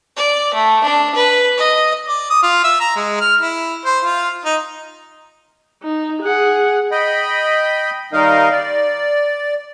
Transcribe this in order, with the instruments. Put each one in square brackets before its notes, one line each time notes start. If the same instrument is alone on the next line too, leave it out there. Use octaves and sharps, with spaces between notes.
[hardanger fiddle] D5
A3
D4
B4
D#5
[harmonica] D5
D#6
F4
E5
A#5
G#3
F6
E4
C5
F4
D#4
[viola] D#4
G#4 F#5
[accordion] D#5 G5 B5
D#3 G3 D#4 A#4 D#5 F5
D5